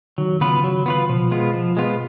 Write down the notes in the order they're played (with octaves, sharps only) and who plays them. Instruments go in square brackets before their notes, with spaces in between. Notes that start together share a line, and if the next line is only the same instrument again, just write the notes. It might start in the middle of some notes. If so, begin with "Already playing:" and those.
[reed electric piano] D#3 [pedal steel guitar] F#3
[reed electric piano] C#3 [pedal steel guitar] B3 F4 B4
[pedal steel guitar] F#3
B3 F4 B4
[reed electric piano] B2 [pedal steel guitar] F3
[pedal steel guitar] G#3 B3 F4
F3
G#3 B3 F4